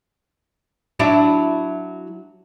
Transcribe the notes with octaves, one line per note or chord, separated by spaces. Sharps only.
F#3 D4 E4